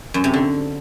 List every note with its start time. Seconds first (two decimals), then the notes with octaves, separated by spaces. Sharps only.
0.14 F#2
0.24 C3
0.34 D3